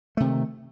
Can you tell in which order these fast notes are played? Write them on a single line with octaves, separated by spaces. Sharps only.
A3 C3 D#3